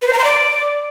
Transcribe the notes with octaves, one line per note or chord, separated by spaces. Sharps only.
B4
C5
A#5
C6
D5